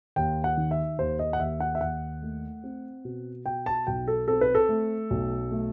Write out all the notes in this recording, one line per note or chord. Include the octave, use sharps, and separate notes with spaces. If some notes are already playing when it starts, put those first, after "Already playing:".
D#2 G5
F#5
D#3
E5
D#2 C5
D#5
F#5
D#2 E5
F#5
E5
D#2 F#5
A3
C4
B2
B2 G5
A5
B1 G5
A4
C4 A4
B4
A4
A3
B1
A3